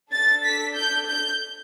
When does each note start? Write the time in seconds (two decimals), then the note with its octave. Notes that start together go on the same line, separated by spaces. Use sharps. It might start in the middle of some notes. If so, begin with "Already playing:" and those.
0.12 D4 A4 A6
0.45 B6
0.76 G6
1.08 G6